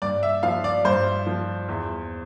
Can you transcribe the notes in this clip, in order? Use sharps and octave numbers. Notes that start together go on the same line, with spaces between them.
G2 D5
E5
F3 F5
D5
G2 C5
F3
E2